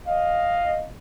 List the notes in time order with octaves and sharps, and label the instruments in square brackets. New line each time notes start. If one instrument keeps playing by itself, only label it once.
[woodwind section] D#5 F5